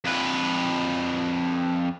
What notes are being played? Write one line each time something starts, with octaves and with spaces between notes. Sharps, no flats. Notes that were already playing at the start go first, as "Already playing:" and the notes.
F2 B4